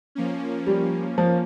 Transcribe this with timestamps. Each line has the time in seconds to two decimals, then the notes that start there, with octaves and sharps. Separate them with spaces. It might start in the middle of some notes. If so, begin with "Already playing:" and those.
0.15 F3 A#3 C#4
0.67 G3
1.18 F3